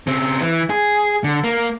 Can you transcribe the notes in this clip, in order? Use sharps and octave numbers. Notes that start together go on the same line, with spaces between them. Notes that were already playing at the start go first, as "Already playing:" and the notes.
C#3 C4
E3
G#4
D3
A#3